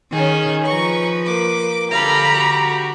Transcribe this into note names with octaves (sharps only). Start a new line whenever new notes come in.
D#3 C#4 G#4
F3 B4 A#5 C#6
A#3 D6
D3 G4 A4 F5 A#5 B5
F#4